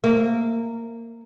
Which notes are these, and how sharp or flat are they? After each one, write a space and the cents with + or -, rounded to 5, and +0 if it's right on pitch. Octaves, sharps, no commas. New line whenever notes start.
A#3 -15